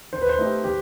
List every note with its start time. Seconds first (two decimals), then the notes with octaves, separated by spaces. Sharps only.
0.13 D#3 C5
0.22 B4
0.29 C5
0.39 A3 D#4 G4
0.64 D#3 G4